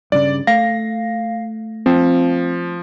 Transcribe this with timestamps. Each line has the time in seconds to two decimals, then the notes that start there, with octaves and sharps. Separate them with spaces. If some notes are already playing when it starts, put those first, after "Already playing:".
0.12 G2 C#3 D5
0.47 A3 F5 A#6
1.86 F3 C4